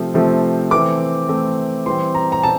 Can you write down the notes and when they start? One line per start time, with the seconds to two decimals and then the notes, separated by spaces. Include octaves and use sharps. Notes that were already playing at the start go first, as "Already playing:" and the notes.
Already playing: C3 F3 A3 C4
0.14 C3 F3 A3 C4
0.71 E3 A3 C4 D6
1.29 E3 A3 C4
1.86 E3 G3 C4 C6
2.15 A#5
2.32 A#5
2.43 C4 A5